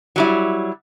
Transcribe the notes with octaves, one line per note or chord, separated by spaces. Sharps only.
F#3 G3 E4